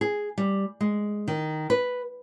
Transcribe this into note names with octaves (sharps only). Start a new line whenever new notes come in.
G#4
G3
G#3
D#3
B4